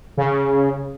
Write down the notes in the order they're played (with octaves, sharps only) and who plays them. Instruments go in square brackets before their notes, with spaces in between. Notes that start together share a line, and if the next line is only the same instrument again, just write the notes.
[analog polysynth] C#3